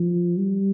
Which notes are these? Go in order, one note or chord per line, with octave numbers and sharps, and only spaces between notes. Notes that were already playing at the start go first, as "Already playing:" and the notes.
Already playing: F3
G3